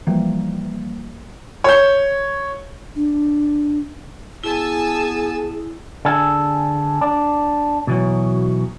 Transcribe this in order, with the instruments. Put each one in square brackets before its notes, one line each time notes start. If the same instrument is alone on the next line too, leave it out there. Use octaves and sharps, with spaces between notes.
[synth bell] E3 F3 G3 A#3
[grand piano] C#5 G6
[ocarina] D4
[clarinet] B3 [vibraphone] E4 [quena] G#4 [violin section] G#5 A5 E6
[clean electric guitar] D3 G#4 A4
D4
B2 E3 F#3